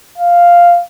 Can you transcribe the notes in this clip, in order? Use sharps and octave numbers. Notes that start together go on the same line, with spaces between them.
F5